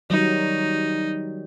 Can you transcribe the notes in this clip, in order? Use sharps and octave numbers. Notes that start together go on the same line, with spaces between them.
D#3 F#3 G3 D#4